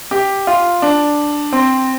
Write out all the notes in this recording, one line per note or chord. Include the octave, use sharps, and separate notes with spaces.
G4
F4
D4
C4